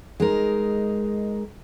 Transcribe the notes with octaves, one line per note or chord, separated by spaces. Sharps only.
G#3 D#4 A#4